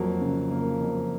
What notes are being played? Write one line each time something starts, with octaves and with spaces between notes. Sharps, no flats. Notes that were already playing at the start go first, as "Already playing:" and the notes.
Already playing: F2 F#3 A#3
C#3
A#3
F2